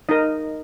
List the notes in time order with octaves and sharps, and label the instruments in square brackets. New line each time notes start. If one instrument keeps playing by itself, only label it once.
[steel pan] D#4 A#4 D#5